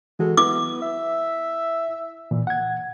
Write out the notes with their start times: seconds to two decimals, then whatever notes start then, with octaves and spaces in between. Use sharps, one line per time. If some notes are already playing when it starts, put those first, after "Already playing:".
0.19 E3 G#3 F#4 A4
0.37 B3 E4 D6
0.82 E5
2.31 A#2 E3
2.47 F#5 G#6